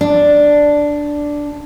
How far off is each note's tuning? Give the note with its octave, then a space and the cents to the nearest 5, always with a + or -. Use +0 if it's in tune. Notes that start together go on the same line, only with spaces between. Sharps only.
D4 +0